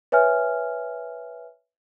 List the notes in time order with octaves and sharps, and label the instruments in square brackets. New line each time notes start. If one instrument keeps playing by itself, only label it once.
[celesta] B4 C#5 E5 G#5 F6